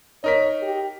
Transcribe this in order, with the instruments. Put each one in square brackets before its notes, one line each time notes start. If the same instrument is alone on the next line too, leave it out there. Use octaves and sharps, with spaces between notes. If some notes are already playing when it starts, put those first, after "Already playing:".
[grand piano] D#4 A#4 B6 [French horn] C#5
[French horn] G4